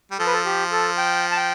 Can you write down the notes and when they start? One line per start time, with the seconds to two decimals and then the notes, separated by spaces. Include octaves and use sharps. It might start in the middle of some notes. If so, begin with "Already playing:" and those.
0.11 G3
0.19 F3 A4
0.26 B4
0.33 A4
0.45 G4
0.71 A4
0.98 G5
1.32 A5
1.37 G5